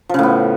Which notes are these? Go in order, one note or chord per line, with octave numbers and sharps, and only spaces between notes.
A2 C#3 F3 B3